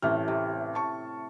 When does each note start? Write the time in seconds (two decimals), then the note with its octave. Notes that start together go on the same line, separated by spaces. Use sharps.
0.02 A1 A2 C3 A3 F6
0.28 C3
0.75 A5 C#6